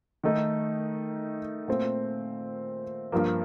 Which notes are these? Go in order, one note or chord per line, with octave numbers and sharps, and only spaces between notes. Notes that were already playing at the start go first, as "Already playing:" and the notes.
D#3 A3 D#4
A#2 A3 C4
G2 F3 A#3